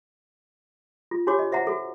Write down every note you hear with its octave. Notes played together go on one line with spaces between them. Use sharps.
F4
D4 F#4 G4 C#5 D6
D#5
C5 E5 F#5 A#5
F#4 A4